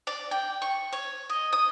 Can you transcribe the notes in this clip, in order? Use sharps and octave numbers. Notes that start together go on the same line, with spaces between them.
D5
G5
C#6
C#5
D#5
D#6